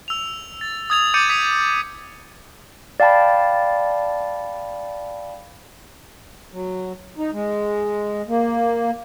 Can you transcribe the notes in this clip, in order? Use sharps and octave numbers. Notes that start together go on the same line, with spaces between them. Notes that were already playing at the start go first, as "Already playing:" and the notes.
E6 F7
A6
D#6 G#6 F7
D6 G6 A6 C#7 D#7
D#6 B6 D#7 F7
D5 F5 G5 A5 B5
F#3
D#4
G#3
A#3